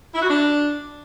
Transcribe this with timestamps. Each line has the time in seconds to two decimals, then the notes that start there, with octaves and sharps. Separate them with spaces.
0.14 E4
0.22 F#4
0.29 D4